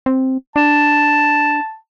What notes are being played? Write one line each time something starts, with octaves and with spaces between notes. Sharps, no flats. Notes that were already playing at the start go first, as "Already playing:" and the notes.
C4
D4 A5